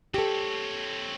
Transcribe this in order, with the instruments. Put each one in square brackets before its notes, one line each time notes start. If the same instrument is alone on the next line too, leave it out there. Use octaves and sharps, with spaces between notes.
[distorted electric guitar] C4 C#5 [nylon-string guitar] G4 A4